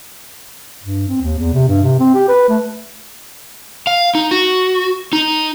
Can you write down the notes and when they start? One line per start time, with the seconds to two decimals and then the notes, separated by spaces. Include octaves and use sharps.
0.83 G2
1.08 C4
1.21 D#2
1.39 E2
1.53 C3
1.68 G2
1.83 C3
1.99 C4
2.15 G4
2.28 B4
2.49 A3
3.87 F5
4.15 D#4
4.31 F#4
5.13 D#4